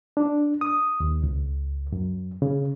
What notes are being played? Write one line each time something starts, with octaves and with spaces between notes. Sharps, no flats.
D4
D#6
D#2
C#2
F#2
C#3